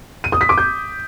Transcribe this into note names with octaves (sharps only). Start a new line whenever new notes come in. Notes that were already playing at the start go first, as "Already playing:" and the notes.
D#7
D#6
B6
D6
G6